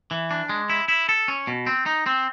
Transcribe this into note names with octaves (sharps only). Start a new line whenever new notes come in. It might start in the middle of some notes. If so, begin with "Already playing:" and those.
E3
D4
G#3
E4
E4
A4
C#4
B2
C4
D#4
C4